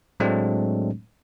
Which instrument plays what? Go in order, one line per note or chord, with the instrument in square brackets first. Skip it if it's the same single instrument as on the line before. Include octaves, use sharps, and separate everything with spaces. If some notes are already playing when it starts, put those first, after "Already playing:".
[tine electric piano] A2 F#3 G#3 A3 C4 D4